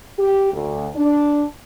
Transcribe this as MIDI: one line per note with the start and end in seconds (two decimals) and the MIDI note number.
0.18 0.50 67
0.53 0.89 38
0.96 1.45 62